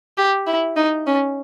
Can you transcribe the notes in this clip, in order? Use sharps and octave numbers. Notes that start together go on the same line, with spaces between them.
G4
E4
D#4
C#4